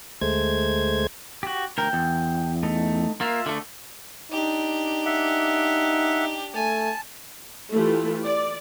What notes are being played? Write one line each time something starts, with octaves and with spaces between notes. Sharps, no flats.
D2 G#3 A3 C5 G#6
F#4 G4
D2 A#4 G5
E2
A3 D#4
A#3 F4 E5 F5
D3 A3
D4 D#4 G4
E5 F#5
A3 G#5 A5
E3 A3 F4 G4
D5